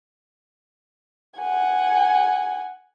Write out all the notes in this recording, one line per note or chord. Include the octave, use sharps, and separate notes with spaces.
F#5 G#5